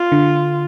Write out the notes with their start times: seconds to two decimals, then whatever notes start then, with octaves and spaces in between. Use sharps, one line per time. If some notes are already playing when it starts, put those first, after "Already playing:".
Already playing: F4
0.12 D3